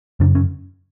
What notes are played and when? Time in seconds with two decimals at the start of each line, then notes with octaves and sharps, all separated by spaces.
0.20 F#2 C#3 D4
0.35 C#4